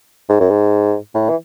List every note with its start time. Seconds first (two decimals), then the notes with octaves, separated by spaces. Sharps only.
0.29 G#2
0.40 F#2
0.51 G#2
1.15 A2
1.30 E3